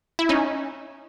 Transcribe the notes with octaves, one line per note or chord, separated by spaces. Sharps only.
E4
C#4 D#4